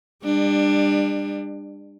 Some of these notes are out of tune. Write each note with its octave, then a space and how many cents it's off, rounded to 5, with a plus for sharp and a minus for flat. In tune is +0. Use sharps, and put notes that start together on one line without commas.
G3 +35 D4 +20